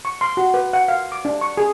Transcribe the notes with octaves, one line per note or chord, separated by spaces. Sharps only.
C#6
C6
F#4
B4
F#5
F5
D6
D4
C#6
G#4